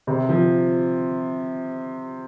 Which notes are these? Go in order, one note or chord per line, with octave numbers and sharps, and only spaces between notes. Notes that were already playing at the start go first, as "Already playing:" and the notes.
C3
F3